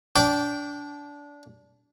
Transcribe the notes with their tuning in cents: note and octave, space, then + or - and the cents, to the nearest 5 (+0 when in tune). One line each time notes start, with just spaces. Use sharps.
D4 -20 G5 -5 D6 -10